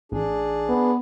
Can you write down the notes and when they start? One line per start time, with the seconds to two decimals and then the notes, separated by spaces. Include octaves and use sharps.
0.12 A1 D4 G#4
0.69 B3